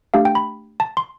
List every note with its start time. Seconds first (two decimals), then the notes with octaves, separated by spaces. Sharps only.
0.14 A3 D4 G4 F5
0.25 G5
0.35 B5
0.80 A5
0.97 C6